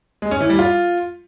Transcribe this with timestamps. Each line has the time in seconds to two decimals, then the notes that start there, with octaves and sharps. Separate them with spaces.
0.22 G#3
0.31 C#4
0.40 E3
0.50 G3
0.59 F4